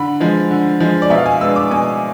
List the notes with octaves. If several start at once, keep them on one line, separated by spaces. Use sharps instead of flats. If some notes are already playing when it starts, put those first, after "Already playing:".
Already playing: D3 B5
F3 G#3
D3
F3 G#3
D5
B2 E5
F5
G#5
G#3 B3 D4 E6
D6
B2 G#5